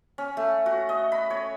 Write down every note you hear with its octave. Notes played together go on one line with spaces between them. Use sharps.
C#4
A3
F#4
D#5
B5
C#5